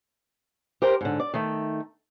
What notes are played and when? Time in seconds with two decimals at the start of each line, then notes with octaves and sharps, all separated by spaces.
0.82 G4 A#4 C5
1.01 G#2 D3
1.20 D5
1.34 D#3 A3